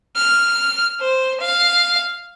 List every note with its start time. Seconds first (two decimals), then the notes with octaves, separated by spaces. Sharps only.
0.16 F6
1.00 C5
1.40 F5